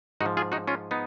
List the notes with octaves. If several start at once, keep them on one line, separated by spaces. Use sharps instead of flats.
G#2 D#4 F#4
F3
F4 G#4
D#4 F#4
C#4 F4
B3 D#4